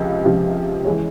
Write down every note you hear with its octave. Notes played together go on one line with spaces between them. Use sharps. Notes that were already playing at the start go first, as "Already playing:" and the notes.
Already playing: C#2 C3 F3
C#2 C3 F3
E3 G#3 C#4